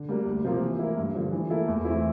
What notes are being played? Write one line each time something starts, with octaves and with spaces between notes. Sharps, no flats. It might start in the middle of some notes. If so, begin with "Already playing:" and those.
Already playing: D3
G3 A#3 D4
D2
C3 F3 A#3 F4
E3
A#3 E4
G2
D3 F3
E3
A#3 E4 A4
E2
E3 A3 C4 E4